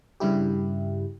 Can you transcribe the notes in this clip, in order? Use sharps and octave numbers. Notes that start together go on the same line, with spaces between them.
G2 C#3 G3 E4 G4